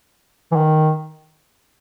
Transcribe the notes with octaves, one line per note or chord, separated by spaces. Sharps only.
E3
D#3